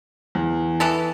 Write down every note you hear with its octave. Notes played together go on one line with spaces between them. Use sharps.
E2
E3 B3 A4